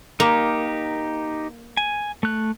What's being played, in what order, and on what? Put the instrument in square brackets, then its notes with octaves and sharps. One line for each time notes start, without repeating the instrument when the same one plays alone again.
[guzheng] A#3 [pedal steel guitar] D#4 G4
[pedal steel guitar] G#5
A3 F#6